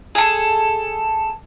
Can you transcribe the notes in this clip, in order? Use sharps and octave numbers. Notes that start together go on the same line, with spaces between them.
G#4 A4